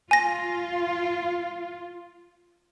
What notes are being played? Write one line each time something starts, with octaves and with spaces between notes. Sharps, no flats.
F4 G#5 A#6